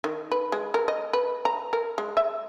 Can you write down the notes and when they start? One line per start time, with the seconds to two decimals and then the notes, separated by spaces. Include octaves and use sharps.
0.04 D#3
0.32 B4
0.52 G#3
0.74 A#4
0.88 D#5
1.13 B4
1.45 A#5
1.73 A#4
1.98 G#3
2.17 E5